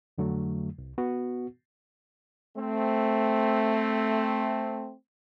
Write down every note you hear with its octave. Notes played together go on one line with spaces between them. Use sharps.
F2 D3 F#3 A3
C2
B3 F#4
A3 C4